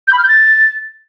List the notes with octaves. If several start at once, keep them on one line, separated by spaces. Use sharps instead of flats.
G6
B5
F6
G6
A6